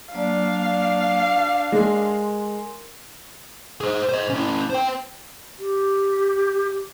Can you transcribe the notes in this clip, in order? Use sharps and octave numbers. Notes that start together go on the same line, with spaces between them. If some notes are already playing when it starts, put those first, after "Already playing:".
F#3 A#3 D4 D5 F5
G#3 A#4 G#5 C6
G#4 C5
C5 D#5
C#4 E4
C5 G5
G4